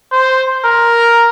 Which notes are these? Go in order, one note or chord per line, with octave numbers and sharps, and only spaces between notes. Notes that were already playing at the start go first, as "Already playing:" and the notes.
C5
A#4